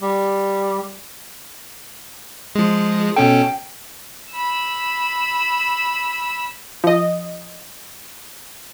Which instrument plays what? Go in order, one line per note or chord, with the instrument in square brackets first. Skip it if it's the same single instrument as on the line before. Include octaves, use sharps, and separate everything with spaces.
[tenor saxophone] G3
[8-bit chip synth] F3 G#3
[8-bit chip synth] B2 C#4 A4 [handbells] G5
[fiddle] B5 E6
[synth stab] F3 D#5